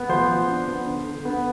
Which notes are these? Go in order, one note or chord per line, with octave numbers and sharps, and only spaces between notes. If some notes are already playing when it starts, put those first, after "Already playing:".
Already playing: B3
F3 C5
F3
D4
B3
D3
D3
B3